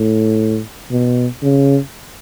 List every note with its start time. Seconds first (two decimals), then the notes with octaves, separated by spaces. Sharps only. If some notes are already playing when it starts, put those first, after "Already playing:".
Already playing: A2
0.91 B2
1.42 C#3